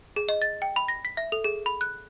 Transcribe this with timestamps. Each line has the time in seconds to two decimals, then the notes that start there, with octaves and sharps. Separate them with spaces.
0.16 G#4
0.29 D#5
0.42 A6
0.62 G5
0.76 B5
0.88 A#6
1.05 B6
1.17 E5
1.32 A4
1.44 G#4
1.66 B5
1.81 F#6